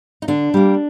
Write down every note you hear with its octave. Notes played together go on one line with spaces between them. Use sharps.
D#4
D3 D4
G3 A#3